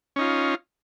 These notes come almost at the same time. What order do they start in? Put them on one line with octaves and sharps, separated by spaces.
C#4 D#4 F4